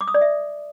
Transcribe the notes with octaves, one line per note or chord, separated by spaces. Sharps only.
D6
D#6
D5
E5